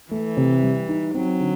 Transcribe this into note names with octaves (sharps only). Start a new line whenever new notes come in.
E3 A3
C3
G3
D#4
F#3 C4
D3